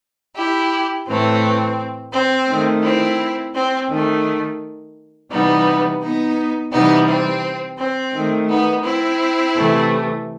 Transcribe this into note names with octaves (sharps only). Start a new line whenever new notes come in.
E4 G4
A2 E3 A3 C4
C4
D#3 A3
C4 E4
C4
D#3 A3
C3 E3 G3 B3 D#4
B3 D#4
C3 E3 G3 B3 D#4
C4
C4
D#3 A3
B3 D#4
C4 E4
C3 E3 A3